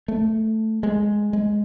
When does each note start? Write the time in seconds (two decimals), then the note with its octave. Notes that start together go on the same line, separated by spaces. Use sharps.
0.08 A3
0.83 G#3
1.33 G#3